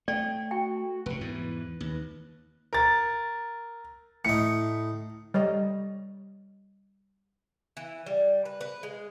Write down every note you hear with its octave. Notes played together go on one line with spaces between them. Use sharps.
A3 D5 G5
F#4 G5
F1 C#3 B4
E2 G#2 E3
D#2
A#4 A6
A2 D#4 C#7
G3 C#5 D#5
E3
G3
B4
B4
G#3